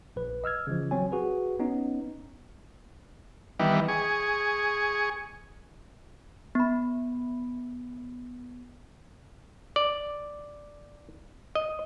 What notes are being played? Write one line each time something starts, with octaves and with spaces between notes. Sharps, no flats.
A#1 B4
D#5 E6 F6 G#6
C#3 E3 F3
F#3 C4 C5 C#5 G#5
F#4 G#4 B4
B3 C#4 D#4
D#3 E3 G3 B3
G#4 C#6
B3 B5
D5
D#5